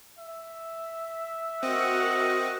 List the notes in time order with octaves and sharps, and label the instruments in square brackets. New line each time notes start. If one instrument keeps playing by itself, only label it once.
[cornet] E5
[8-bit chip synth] C4 [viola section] F#4 A#4 F#5 [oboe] D#5